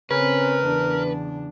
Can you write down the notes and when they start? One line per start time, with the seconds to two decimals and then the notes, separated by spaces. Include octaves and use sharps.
0.11 C#3 C4 C#4 A#4 B4
0.64 E2 D4